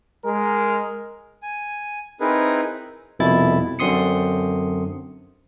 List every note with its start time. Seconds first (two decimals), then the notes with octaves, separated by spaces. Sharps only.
0.23 G#3 A#4
1.42 G#5
2.20 C4 D#4 E4 G#4 A#4 B4
3.19 C2 F2 B2 E4 A6
3.79 F#2 D3 C4 C6 D#6 C#7